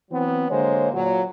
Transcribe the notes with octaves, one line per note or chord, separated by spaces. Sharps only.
E3 F#3 B3 C4
D3 F#3 G#3 A#3 C5 C#5
A#2 F#3